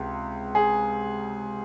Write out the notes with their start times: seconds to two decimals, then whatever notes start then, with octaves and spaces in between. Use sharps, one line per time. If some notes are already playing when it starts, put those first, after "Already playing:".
Already playing: C#2 C3
0.55 G#4